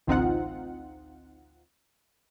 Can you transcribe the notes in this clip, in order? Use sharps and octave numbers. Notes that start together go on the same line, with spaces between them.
A1 D2 C4 D#4 F4 F#5